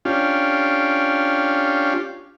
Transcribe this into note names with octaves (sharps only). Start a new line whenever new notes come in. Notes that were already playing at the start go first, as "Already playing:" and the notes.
C#4 D4 F4 G4